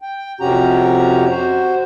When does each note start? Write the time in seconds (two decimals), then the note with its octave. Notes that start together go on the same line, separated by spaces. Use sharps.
0.02 G5
0.41 F2 C3 C#4 F#4 G4 A#5
1.30 F#4 C5